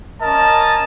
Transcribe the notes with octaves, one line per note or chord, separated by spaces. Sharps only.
C#4 A#4 D#5 A5